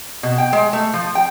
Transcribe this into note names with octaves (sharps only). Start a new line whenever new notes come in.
B2
G5
G#3
A3
F3
G5